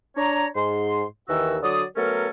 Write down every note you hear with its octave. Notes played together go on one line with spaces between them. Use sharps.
D4 C#5 A#5
G#2 C6
D#2 D#3 E3 F#4 E6
D3 F#3 C#5 D5 D#6
F#3 A3 B3 C#4 A4 A#4